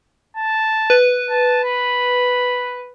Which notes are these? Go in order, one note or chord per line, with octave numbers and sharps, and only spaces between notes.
A5
B4
A5
B5